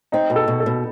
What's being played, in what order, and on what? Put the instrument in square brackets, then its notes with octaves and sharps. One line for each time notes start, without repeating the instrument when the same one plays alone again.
[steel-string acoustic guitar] C4 [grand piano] D#4
[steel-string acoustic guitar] B2
[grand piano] A4
[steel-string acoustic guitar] B2
[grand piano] A4
[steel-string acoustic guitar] B2